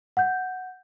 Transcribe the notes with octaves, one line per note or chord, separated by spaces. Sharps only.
F#5 G6